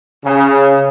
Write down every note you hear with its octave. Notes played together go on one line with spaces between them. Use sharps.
C#3